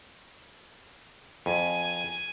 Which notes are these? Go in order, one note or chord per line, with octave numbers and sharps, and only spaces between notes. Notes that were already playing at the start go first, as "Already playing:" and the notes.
F2 G#5